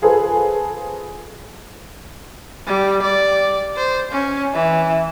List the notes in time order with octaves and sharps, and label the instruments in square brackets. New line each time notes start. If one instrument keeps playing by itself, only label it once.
[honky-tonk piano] F4 G#4 A4 B4 C5
[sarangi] G3
D5
C5
C#4
E3